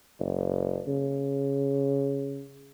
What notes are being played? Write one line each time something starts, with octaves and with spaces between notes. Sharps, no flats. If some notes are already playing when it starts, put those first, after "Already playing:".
F#1
C#3